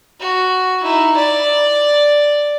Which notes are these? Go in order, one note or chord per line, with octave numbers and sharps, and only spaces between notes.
F#4
D#4 E4
D5